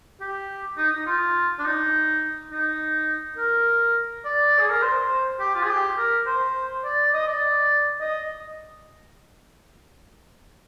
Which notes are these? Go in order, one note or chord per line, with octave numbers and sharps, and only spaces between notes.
G4
D#4
D#4
F4
D4
D#4
D#4
A#4
D5
G#4
A#4
C5
G4
F4
G#4
G4
A#4
C5
D5
D#5
D5
D#5